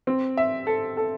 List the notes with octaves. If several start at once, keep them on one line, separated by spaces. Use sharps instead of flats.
C4
E5
A4
A4